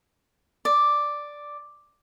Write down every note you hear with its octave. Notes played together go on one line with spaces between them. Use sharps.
D5